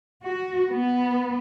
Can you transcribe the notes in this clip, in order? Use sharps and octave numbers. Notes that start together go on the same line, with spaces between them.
F#4
B3